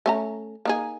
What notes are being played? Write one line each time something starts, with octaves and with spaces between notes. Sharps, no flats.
A3 C#4 A#5
A#3 D#4 G#4